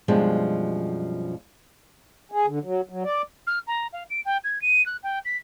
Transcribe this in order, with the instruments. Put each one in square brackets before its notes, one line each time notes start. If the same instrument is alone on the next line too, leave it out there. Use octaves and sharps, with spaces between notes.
[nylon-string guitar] F#2 B2 F3 G3 G#3 D4
[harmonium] G#4
D3
F#3
F#3
D5
[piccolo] F6
A#5
F5
D7
G5
G#6
D#7
F#6
G5
B6